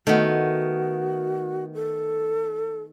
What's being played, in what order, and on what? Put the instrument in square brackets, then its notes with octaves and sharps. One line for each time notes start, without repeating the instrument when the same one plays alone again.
[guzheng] D#3 B3 [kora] A3 [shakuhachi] F#4
[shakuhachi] A4